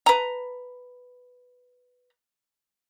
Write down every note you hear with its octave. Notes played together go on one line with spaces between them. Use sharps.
B4 A#5